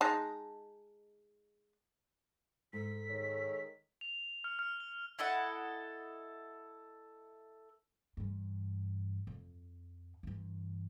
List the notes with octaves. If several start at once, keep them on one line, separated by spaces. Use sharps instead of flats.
G#3 D#4 A5
G#2 A4 B6
D#3 G#3 C#5
F7
F6
F6
G7
E4 A4 D#5 F#5
G2 E3
F2
G2 E3